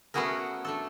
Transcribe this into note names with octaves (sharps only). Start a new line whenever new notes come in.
A3 B3 C#4 F#4 G#4 A#4
A3 D4 A4